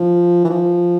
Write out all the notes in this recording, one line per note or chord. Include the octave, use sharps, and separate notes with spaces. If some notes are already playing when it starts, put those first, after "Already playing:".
Already playing: F3
E3
F3